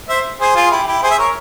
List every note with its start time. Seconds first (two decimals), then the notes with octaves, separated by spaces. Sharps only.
0.09 C5 E5
0.41 G#4 C5
0.55 F4 G#4
0.71 E4 G4
0.87 E4 G4
1.03 G#4 C5
1.11 E5
1.19 A#4 C#5